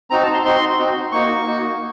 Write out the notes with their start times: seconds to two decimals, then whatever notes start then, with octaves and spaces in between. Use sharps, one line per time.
0.10 C4 D#4 F#4 A#5
0.23 A5
0.34 C6
0.45 C4 D#4 F#4 C6
0.79 C4 D#4 F#4
1.12 A#3 D#4 F#4 C#6
1.46 A#3 D#4 F#4